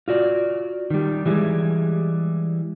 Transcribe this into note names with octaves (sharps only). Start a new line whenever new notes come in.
F4 F#4 D5
D#3 G3
E3 G3 G#3